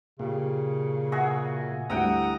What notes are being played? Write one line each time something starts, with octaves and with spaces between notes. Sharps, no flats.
A#2 C#3 G4
F#4 G#4 E5
D2 G3 E4 E5 F#5 G5 A#5 D#6